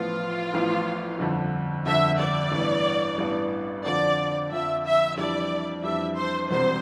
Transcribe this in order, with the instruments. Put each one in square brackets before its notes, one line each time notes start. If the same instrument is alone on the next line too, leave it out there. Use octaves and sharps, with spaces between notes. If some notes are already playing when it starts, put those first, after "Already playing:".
Already playing: [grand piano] A1 A2 F3 B3 [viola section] F4
[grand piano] A1 A2 F3 B3
G1 F2 D3
[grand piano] G1 F2 D3 [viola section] E5
[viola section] D5
[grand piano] A1 G2 E3 B3
A1 G2 E3 B3
[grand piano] F2 D3 F3 [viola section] D5
[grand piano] F2 D3 F3 [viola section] E5
[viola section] E5
[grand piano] F2 E3 G3 D4 [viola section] D5
[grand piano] F2 E3 G3 D4 [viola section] E5
[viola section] C5
[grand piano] E1 E2 C3 G3 C4 [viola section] C5